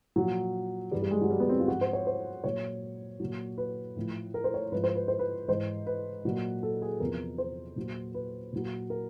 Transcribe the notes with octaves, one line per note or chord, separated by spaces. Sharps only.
A#2 F3 F#3
G2 E3 G3
G3
G#3
F#3
G3
B3
C4
F4
G#2 F3 F#4
C5
C#5
C5
A#2 F#3 C#5
A#2 F#3
B4
A2 F3
A#4
C5
C#5
G#2 F3 B4
C5
B4
C5
B4
G#2 E3 C5
B4
A#2 F#3
A4
G#4
E2 C3 F3 A#4
C5
A#2 F#3
B4
A#2 F#3
A#4